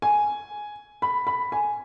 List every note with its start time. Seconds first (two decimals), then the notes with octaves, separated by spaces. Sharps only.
0.02 G#5
1.02 B5
1.27 B5
1.52 G#5